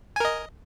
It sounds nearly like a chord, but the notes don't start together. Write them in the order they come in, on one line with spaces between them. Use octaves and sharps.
G#5 A#4 D#5